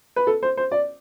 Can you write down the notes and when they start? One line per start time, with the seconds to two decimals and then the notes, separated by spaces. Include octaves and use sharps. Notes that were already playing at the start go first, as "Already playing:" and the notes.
0.16 B4
0.27 A4
0.43 C5
0.57 C5
0.72 D5